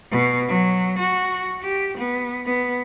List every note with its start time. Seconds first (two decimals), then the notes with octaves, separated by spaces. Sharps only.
0.11 B2
0.49 F#3
0.99 F#4
1.62 G4
1.98 B3
2.46 B3